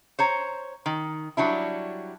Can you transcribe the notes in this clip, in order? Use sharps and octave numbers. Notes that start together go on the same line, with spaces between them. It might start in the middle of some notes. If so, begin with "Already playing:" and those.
C5 C#5 A#5
D#3
F#3 G3 D4 E4